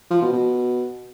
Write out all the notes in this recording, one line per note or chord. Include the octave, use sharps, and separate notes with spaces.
F3
B2
B2